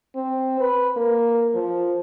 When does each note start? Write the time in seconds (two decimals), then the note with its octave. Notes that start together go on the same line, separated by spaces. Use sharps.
0.15 C4
0.60 B4
0.97 A#3
1.55 F3